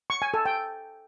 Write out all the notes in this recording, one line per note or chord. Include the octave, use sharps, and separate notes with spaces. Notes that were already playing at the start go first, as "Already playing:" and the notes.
C#6
G#5
A4
G5